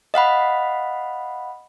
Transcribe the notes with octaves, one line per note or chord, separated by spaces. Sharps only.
D#5 F5 F#5 B5